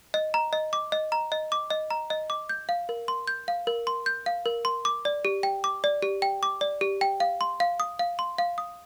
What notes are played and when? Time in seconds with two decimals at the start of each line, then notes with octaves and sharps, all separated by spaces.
0.14 D#5
0.34 A#5
0.53 D#5
0.73 D6
0.92 D#5
1.12 A#5
1.32 D#5
1.52 D6
1.70 D#5
1.90 A#5
2.10 D#5
2.30 D6
2.49 G6
2.69 F5
2.89 A#4
3.08 C6
3.28 G6
3.48 F5
3.67 A#4
3.87 C6
4.06 G6
4.26 F5
4.46 A#4
4.65 C6
4.85 D6
5.05 D5
5.25 G4
5.43 G5
5.64 D6
5.84 D5
6.02 G4
6.22 G5
6.43 D6
6.61 D5
6.81 G4
7.01 G5
7.20 F5
7.41 C6
7.60 F5
7.80 D#6
7.99 F5
8.19 C6
8.38 F5
8.58 D#6